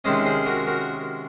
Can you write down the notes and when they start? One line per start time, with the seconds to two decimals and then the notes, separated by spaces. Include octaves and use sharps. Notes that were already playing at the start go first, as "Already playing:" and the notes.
0.04 C3 D#3 G#3 C#4 C5 D#5
0.26 G#4 C5
0.46 F#4 A#4
0.67 F#4 A#4